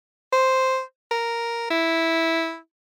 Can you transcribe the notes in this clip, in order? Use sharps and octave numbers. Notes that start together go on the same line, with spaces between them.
C5
A#4
E4